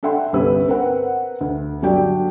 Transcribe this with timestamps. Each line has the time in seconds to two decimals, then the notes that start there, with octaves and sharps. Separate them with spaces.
0.03 D4 A4 E5 F#5 G5 C6
0.33 G1 C2 C#4 G4 B4 E6
0.68 C4 A#4 B4 F#5
1.41 D2
1.82 G1 F#3 D4 G4 D5 G5